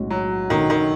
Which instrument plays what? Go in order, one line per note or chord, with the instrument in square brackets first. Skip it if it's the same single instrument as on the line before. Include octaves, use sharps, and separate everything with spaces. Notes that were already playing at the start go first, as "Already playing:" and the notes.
Already playing: [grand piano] B1 A2 G#3 C#4 F#4
[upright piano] F#3
[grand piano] B1 B2 A3 C#4 [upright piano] D#3
[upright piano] D#3